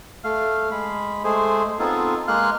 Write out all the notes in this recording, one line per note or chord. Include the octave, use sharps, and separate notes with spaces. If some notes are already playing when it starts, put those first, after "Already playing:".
A3 F5
G#3 B5
G#3 A3 G#4 C5
B3 C4 D#4 F4 G#4 A4
G#3 A#3 F5 C6 F6 F#6